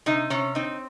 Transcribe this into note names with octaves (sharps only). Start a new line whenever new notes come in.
C3 D#4
C3 C#4
C4 D#4